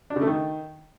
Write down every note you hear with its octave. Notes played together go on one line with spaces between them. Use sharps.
D4
C#3
A3
D#3